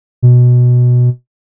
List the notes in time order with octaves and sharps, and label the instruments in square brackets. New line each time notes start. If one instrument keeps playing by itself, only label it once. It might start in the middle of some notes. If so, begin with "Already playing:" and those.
[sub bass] B2